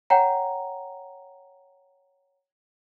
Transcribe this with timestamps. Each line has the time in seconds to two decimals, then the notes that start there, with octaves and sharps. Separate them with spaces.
0.10 C#5 F#5 G5 A#5